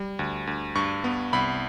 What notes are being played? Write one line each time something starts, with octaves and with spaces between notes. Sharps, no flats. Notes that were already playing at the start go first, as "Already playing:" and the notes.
Already playing: G3
D2
D2
G2 C#6
B3
C2 B5